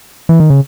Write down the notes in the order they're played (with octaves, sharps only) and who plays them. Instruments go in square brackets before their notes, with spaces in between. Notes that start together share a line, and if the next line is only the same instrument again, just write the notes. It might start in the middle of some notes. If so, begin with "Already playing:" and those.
[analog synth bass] E3
D#3
C#3